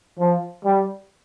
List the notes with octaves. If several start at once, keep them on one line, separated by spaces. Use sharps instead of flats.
F3
G3